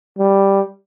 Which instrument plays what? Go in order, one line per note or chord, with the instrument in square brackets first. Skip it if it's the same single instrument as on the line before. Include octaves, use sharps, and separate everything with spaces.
[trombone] G3